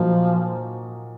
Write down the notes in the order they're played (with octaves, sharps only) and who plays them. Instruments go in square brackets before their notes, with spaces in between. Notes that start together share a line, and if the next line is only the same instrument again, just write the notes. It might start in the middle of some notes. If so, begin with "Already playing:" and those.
Already playing: [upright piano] A#2 F#3 A#3 D#4 F#4 [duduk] F3